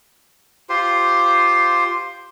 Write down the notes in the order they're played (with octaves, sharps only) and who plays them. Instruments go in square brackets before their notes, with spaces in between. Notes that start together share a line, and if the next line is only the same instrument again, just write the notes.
[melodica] F4 G4 C5 C6